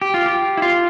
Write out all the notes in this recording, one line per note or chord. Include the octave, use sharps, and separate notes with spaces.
G4
F4
G4
E4
F4